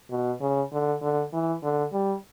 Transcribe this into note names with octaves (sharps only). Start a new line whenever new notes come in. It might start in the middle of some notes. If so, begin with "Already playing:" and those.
B2
C#3
D3
D3
E3
D3
G3